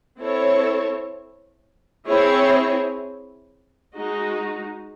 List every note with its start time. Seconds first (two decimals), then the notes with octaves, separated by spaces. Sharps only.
0.19 C4 E4 A4 C#5
2.08 C4 E4 G#4 C#5
3.95 G#3 D#4 F#4